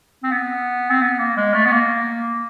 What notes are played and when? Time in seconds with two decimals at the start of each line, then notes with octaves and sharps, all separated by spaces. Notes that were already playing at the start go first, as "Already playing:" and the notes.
0.24 C4
0.32 B3
0.91 C4
1.02 B3
1.19 A#3
1.37 G#3
1.54 A3
1.66 B3
1.72 A#3